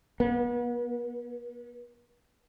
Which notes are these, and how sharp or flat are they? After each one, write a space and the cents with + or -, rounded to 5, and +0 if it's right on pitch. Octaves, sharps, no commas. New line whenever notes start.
B3 -40